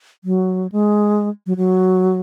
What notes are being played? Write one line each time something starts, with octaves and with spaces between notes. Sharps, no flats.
F#3
G#3
F#3
F#3